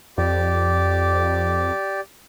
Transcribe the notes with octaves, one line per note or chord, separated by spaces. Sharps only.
F2 G4 D5